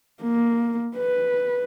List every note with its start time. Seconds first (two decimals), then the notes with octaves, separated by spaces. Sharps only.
0.22 A#3
0.97 B4